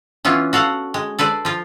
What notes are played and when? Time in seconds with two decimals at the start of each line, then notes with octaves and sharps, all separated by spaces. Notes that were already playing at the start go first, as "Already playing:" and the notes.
0.25 E3 B3 C#4 F4
0.53 F#4 A4 F5 F#5
0.94 G#3
1.19 A4 B4 C5 D5
1.45 F3 F4